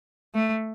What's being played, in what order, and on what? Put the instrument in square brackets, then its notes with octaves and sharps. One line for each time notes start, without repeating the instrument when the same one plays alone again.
[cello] A3